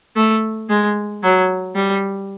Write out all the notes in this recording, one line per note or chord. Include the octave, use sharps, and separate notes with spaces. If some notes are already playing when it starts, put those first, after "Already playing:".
A3
G#3
F#3
G3